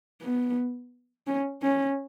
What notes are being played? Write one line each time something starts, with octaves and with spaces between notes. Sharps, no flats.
B3
C#4
C#4